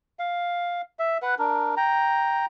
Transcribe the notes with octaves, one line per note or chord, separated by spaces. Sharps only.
F5
E5
B4 F#5
D4 A#4
G5 A#5